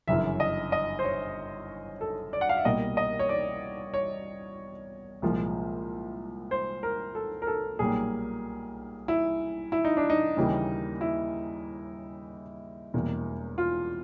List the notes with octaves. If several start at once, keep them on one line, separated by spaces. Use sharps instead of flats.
G1 F#2 C#3 E3 E5
D#5
D#5
C5
C#5
A4
D5
F#5
F5
E5
C2 B2 G3 A#3 D#5
D#5
C#5
D5
C#5
C2 A#2 F3 G#3
C5
A#4
A4
A#4
A4
B1 A#2 G3 A#3 G#4
E4
E4
D#4
D4
D#4
D#2 C#3 E3 G3 A#3
E4
E1 E2 B2 G3 A#3
F4